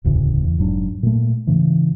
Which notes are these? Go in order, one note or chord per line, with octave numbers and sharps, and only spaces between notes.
E1 D2 A2 C#3
E2
F1 G#2 F#3 D4
A#2 A3
G#2 C#3 E3